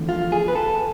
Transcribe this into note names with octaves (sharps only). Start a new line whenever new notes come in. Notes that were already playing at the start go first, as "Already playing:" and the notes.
Already playing: E2 D3 F3 A3
F4
G#4
B4
A4